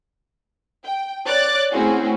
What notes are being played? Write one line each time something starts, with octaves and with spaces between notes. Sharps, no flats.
G5
C#5 D5 D6 F#6 A6
A3 C4 C#4 E4 F#4 G#4